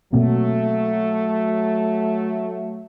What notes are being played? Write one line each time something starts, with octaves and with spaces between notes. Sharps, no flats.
B2 F#3 A3 A#3 C4